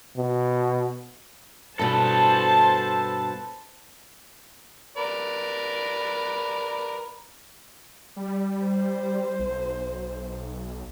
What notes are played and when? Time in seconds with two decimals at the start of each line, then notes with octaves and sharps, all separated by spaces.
0.17 B2
1.79 G2 B2 A4 B4 C5 A5
4.97 A#4 B4 D5
8.16 G3
8.65 C5
9.39 B1